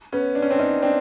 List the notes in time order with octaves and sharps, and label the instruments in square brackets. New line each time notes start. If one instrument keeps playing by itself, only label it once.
[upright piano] B3 C#4
D4
C#4
C4 D4
C#4 D#4
C4 D4